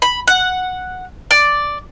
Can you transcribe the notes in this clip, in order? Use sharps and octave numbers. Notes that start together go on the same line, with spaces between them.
B5
F#5
D5